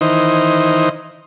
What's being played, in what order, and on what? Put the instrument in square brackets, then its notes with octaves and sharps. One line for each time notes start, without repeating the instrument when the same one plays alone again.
[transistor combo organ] D#3 E3 D#4 C5